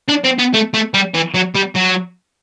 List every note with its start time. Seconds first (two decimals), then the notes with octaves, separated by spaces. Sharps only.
0.08 D4
0.24 C4
0.38 B3
0.54 A3
0.74 A3
0.94 G3
1.14 E3
1.34 F#3
1.55 G3
1.76 F#3